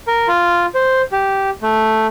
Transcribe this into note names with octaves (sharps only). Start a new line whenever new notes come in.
A#4
F4
C5
G4
A3